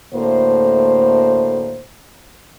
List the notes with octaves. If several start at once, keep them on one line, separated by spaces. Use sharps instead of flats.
D2 A2 A#3 C5